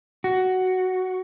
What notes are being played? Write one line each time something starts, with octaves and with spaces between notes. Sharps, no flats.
F#4